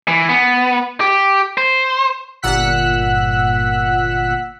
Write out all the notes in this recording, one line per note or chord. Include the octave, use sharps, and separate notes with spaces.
E3
B3
G4
C5
G1 A#2 F#5 E6 F#6 B6